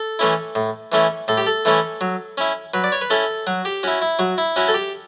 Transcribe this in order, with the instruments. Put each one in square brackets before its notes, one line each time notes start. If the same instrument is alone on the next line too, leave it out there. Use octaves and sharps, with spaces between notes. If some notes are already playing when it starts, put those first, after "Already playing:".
Already playing: [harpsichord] A4
E3 A3 C#4 E4
A2
E3 A3 C#4 E4
A2 A4
G4
A4
E3 A3 C#4 E4
F#3
C#4 E4
F#3 B4
D5
C#5
B4
C#4 E4 A4
F#3 F#4
G4
C#4 E4 F#4
E4
F#3 F#4
E4
C#4 E4 F#4
A4
G4